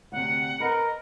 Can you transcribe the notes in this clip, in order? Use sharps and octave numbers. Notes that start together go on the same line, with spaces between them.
D2 C3 F#5
A#4 B4 D#5